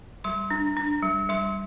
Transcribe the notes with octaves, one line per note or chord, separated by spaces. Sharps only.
G3 C6
D4
D4
G3
G3 C6